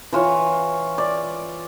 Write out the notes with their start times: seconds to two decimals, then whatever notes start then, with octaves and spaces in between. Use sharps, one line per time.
0.12 E3 F4 C#5
0.98 D5